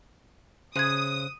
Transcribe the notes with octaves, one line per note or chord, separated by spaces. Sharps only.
C#3 C5 D#6 F#6 G#6 D#7